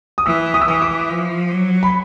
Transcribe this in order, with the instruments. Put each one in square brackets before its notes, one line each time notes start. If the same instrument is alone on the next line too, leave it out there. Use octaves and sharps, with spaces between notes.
[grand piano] D#6
[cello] E3 [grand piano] E6
[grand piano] D#6
E6
[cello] E3 [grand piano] D#6
[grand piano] D6
[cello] F3
F#3
[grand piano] B5